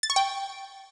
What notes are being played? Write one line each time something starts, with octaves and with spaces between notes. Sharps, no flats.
A6
C#6
G5